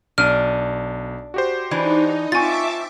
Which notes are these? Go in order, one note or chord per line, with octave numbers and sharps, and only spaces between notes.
B1 D4 F6 D#7
F#4 G4 C5
E3 D4 D#4
C4 F4 E5 G#5 A5 C#6 D6 A6